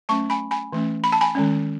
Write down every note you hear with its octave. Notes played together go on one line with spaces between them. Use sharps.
F#3 A3 C#4 A5 C#6
G#5 B5
G#5 B5
E3 A3 C#4
B5
A5
G#5 B5
D#3 G#3 C#4